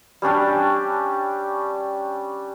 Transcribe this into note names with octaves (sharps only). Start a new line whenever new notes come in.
G3 C#4 D4 G4